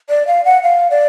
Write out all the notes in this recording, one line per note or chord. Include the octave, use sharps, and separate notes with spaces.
D5
F5
F#5
F5
D5